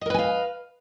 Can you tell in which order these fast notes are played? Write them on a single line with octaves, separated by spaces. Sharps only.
D#5 A#4 B4 G#5 F5